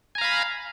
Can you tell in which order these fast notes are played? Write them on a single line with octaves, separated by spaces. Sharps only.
G#5 A#5 F5 B5